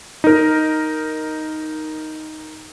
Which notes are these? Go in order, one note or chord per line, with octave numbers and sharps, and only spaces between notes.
D#4 A#4